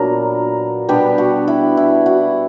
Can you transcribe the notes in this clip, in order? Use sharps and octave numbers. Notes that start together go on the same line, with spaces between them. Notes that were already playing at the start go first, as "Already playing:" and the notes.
Already playing: A#2 F#3 B3 D4 A#4
B2 G3 B3 D4 G4
F#4
E4
E4
F#4